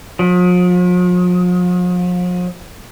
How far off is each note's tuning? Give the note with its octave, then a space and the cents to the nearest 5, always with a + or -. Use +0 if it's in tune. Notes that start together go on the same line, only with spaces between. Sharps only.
F3 +45